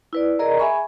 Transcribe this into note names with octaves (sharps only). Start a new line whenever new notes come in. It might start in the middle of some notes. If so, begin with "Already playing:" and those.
E4 B4 D5
G#4 A#4 D5 D#5 A#5
G#4 E5 G#5 B5 C#6